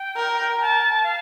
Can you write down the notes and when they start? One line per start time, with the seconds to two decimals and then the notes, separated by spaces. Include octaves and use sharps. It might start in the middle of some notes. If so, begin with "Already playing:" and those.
Already playing: G5
0.17 A#4
0.61 A5
1.04 F5